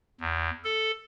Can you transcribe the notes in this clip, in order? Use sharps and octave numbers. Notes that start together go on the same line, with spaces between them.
E2
A4